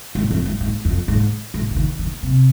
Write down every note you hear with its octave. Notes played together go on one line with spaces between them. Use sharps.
G#2
F2
G#2
G#2
F2
G#2
G#2
C3
D#3
D#3
C3